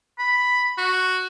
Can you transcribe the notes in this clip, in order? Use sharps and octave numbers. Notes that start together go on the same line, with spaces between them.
B5
F#4